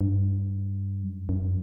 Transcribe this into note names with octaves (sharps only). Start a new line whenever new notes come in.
G2
F#2
F#2